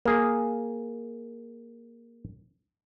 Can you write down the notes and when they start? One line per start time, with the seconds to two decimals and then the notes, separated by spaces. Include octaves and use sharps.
0.05 A#3 G#4